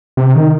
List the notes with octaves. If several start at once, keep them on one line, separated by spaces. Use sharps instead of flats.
C3
D#3